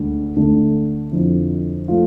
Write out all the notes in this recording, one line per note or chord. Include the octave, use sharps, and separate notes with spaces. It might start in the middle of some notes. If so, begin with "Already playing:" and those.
Already playing: D2 D3 G#3
D2 D3 A3 D4
F2 D3 F3 E4
F3 A3 F4